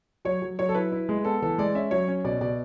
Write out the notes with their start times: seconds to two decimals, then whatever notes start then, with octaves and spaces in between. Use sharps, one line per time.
0.25 F#3 C#5
0.42 F#3
0.59 F#3 C#5
0.69 A4
0.75 E4 B4
0.92 E4
1.09 G#3
1.25 B3 A4
1.42 E3 A4
1.58 G#3 D5
1.75 C#4 E5
1.91 F#3 C#5
2.08 C#4
2.25 B2 D5
2.41 B2 D5